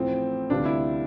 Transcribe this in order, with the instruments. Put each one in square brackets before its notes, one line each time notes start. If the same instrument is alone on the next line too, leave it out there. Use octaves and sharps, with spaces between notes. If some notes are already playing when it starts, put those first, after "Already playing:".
Already playing: [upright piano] A1 A2 F3 [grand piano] C4
[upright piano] D2 C3 G3 B3 F4 [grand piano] D4
[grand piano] E4